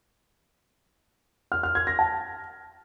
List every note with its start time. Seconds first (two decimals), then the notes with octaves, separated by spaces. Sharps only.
1.52 F6
1.63 F6
1.75 G#6
1.87 A#6
1.99 A5